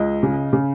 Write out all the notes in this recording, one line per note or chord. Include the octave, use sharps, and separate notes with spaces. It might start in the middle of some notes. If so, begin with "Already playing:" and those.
Already playing: C#2 D#5
C#3
C#3